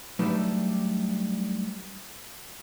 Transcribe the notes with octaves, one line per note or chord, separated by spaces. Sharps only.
F#3 G3 A3 D4 D#4 B4